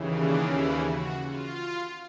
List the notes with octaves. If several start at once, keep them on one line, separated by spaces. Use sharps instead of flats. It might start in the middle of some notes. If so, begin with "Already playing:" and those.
Already playing: D#2 C#3 E3
D4
E4
F#4
F4